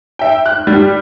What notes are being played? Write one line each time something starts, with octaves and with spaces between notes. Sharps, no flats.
E5 G5
F#6
G3